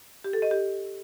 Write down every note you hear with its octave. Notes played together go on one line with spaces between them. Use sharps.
G4
A4
D#5
G4